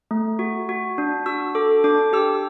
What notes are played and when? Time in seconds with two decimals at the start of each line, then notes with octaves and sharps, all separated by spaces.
0.11 A3
0.39 F#4
0.69 F#4
0.98 D4
1.26 F#4 E6
1.55 A4 D6
1.84 D4 D6
2.13 G4 E6